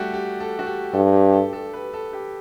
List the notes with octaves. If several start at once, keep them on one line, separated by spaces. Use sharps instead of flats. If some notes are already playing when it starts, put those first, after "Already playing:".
Already playing: G3 A3 F#4 G4
G4
A4
F#4
G4
G2 A4
G4
A4
A4
B4
A4
G4